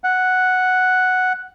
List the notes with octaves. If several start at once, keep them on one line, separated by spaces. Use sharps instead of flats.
F#5